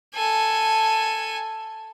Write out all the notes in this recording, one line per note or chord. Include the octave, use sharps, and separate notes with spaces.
A4 G#5